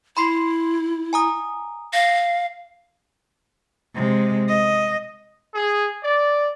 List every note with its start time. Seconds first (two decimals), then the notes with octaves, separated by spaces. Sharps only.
0.17 E4 B5 C6 C7
1.13 G#5 A#5 D#6
1.93 F5 A#6
3.95 C3 G#3
4.48 D#5
5.55 G#4
6.04 D5